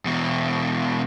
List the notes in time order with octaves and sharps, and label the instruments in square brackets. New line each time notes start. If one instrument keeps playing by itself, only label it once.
[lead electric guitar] E2 B2